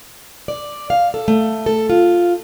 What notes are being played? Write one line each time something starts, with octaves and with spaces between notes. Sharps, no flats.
D5
F5
A4
A3
A4
F4